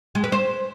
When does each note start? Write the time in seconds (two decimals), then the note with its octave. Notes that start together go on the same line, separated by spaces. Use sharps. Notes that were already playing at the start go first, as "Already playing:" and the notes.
0.15 G#3
0.24 B4
0.32 C5